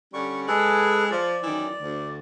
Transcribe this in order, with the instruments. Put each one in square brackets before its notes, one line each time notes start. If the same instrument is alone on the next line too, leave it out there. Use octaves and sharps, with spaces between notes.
[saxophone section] D3 G3 C#4 [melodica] C#6
[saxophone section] G#3 [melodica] G#4 A4 B4
[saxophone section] F3 [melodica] D5
[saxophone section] F#2 D#3 E3
D2